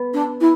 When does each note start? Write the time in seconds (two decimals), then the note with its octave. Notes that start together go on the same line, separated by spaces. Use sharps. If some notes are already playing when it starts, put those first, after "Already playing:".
Already playing: B3
0.14 D4
0.41 E4